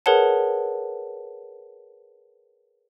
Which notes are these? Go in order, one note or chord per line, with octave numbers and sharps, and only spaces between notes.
G#4 A#4 B4 C#5 F#5 A5